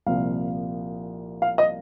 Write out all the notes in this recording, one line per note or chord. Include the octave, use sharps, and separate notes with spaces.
C2 A#2 F3 F5
F5
D#5